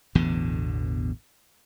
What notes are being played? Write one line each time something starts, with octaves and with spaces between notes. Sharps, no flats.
A1 E2 B2 D3